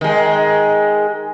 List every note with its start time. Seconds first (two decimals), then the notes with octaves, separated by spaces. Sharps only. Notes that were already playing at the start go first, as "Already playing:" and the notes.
0.01 D#3 G#3